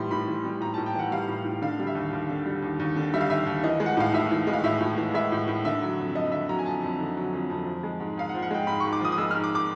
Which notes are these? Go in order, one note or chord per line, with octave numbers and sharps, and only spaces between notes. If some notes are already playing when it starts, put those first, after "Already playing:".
Already playing: A2 E3 G3 C6
A2 B5
E3
G3
A2 A#5
A2 A5
G5
E3 F#5
G3 F5
A2
A2
D3 F5
G3
E5
D#2
D#2
D3
G3
D#2
D#2
D3
G3 E5
F5
D#2 E5
D#2
E3 D#5
G#3
F#5
A2 F5
A2 E5
E3
G#3
F5
A2 E5
A2
E3
G#3 E5
A2
A2
D3 E5
F#3
F2
F2 D#5
D3 E5
F#3 A#5
G#5
F2 A5
F2
D3
F#3
F2
F2
F3
G#3
G#2
G#2 F5
F#5
F3
F#5
G#3 G5
G#2 B5
G#2 C#6
D6
F3 D#6
D#6
G#3 E6
G#2 F6
D6
D6